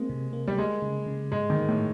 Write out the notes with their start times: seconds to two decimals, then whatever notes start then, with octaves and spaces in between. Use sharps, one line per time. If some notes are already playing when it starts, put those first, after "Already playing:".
Already playing: G#3 A#3 C4
0.10 C3
0.33 A#3
0.48 G3
0.57 G#3 A#3
0.82 C#3
1.06 C#3
1.32 G#2 G#3
1.50 D#3
1.55 A#3
1.68 A2